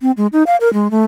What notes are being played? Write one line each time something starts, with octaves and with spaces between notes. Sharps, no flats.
C4
G#3
D#4
F5
A#4
G#3
A3